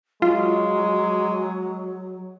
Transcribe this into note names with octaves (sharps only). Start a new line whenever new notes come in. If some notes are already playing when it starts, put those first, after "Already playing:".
F#3 G#3 F4